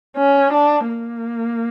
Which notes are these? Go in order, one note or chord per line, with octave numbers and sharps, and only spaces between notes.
C#4
D4
A#3